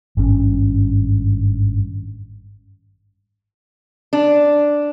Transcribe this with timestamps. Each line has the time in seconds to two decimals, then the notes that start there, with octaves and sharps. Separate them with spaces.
0.17 G#1 G2 C#4
4.13 D4